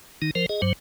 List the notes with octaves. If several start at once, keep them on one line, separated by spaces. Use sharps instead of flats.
D#3 D#4
F3 A#4 C5
G#4 D#5
G2 F#3 C5